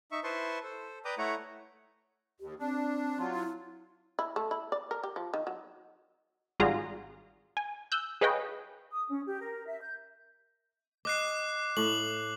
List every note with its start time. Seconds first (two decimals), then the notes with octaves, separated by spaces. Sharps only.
0.12 D#4 E5 C#6
0.24 E4 B4 C5 A5 C6 C#6
0.63 A4 C5
1.05 B4 D5 G5 A#5 D6 D#6
1.18 A3 E4 C#5 F#5 A#5
2.40 D#2 G4
2.60 C4 D4
3.19 F#3 F4
3.34 E4
4.19 E4
4.36 A3
4.51 E4
4.72 D5
4.91 A#4
5.03 G4
5.16 F3
5.34 D#3
5.47 F#3
6.60 G#1 G3 F4 F#4 G#4 A#5
7.57 G#5
7.92 E6 F#6 G6
8.21 G#4 B4 C#5 D#5 F5 G5
8.92 D#6
9.09 C#4
9.26 G4
9.41 A#4
9.67 E5
9.80 G6
11.05 D#5 D6 F#6 C7
11.77 A2 F#7